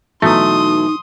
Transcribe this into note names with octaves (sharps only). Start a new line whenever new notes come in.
B2 E3 F#3 A3 D#4 C6 D#6